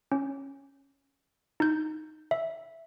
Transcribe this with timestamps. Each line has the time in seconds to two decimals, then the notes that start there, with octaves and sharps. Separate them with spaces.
0.12 C#4
1.60 D#4 G6
2.31 E5